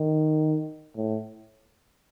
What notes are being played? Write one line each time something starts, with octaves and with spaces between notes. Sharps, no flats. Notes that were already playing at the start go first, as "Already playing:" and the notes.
Already playing: D#3
A2